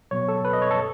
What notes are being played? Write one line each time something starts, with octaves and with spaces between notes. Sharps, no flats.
B2 F#3 B3 C#5
A4
B4
D#5
C#5
A4